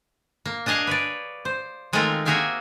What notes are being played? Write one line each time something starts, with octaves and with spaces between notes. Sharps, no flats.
A#3
D4 G#4 D#5 F5 G#5
B4 C#5 D5
C5
D#3 G#3 A3 C4 F4 A#4
A#3 F#4 G#4 E5 F5 G5